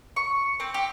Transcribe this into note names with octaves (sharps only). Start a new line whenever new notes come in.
C#6
C4
G4